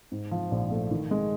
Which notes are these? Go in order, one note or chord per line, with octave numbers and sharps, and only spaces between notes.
G#2
F3
A#1
A3
D#3
G#3